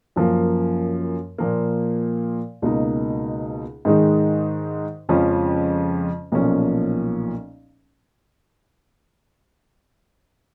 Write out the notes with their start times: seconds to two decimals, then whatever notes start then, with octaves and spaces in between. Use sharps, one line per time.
0.16 F#2 F3 A#3
1.38 A#2 F3 A#3
2.62 C#2 B2 A#3 D#4
3.85 G#2 D#3 G#3 D#4
5.09 F2 C#3 F3 G#3 C#4
6.32 B1 A#2 F3 A#3 C#4